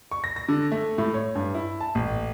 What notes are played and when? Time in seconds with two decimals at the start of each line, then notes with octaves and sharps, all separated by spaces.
0.11 C#6
0.24 A#6
0.36 A#6
0.49 D3
0.72 A3
0.98 A2
1.14 C#5
1.35 G2
1.54 E4
1.81 A5
1.95 A1